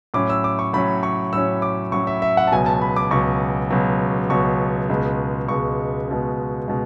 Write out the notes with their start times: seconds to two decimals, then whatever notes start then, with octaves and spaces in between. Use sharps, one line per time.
0.14 A2 F#3 C#4 D6
0.30 E6
0.44 D6
0.59 C#6
0.73 A2 F#3 C#4 B5
1.03 C#6
1.33 A2 F#3 C#4 E6
1.62 D6
1.92 A2 F#3 C#4 C#6
2.07 E5
2.22 E5
2.37 F#5
2.47 A5
2.52 C#2 B2 F#3 G#5
2.66 A5
2.82 B5
2.96 D6
3.11 C#2 B2 F#3 C#6
3.70 C#2 B2 F#3
4.30 C#2 B2 F#3 C#6
4.89 C#2 B2 G#3
5.48 C#2 B2 G#3 C#6
6.08 C#2 B2 G#3
6.68 B2 G#3